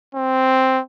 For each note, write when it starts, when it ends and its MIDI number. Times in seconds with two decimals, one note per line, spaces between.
0.15 0.81 60